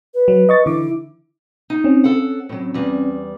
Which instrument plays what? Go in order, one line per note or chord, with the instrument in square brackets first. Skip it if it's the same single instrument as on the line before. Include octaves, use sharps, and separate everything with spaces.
[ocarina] B4
[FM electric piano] F#3
D#5 C#6 A6
[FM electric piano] D3 E3 D6 [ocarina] E4
[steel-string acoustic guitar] D#4
[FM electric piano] C4 C#4
[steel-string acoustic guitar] A4 F#5
A2 F#3
E2 G3